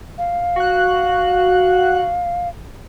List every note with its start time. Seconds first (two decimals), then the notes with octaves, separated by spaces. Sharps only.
0.18 F5
0.56 F#4 F#6